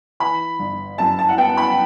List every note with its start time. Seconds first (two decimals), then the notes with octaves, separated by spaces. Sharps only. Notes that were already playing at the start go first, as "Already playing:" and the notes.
0.20 E3 B5
0.59 G1
0.98 F#2 A5
1.19 A5
1.29 F#5
1.38 B3 G5
1.57 B5